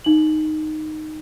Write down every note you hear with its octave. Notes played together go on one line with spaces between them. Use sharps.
D#4 F#7